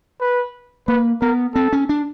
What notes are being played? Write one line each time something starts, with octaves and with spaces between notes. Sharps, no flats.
B4
A#3 B4
B3 A#4
C4 A4
C#4
D4